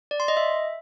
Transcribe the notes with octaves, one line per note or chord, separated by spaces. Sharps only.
D5
C6
D#5
E5